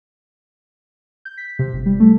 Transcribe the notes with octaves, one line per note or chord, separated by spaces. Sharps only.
G6
B6
C3
G1
G3
A3